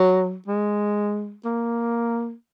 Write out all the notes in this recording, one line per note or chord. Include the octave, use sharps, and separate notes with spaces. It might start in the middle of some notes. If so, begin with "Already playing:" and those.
Already playing: F#3
G#3
A#3